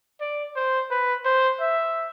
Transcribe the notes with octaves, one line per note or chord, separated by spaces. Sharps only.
D5
C5
B4
C5
E5